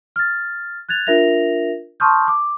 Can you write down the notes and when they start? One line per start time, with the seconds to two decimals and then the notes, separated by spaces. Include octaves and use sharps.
0.16 F6 A6
0.89 F#6 G#6 A6 F7
1.07 D4 F4 A#4 E5 A#6 F7
2.00 A5 C6 C#6 D#6 F6 G6
2.28 D6